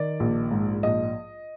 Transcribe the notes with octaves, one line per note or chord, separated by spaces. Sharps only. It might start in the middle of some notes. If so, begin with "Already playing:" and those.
Already playing: D#3 D5
A#1
G#2
A#1 D#5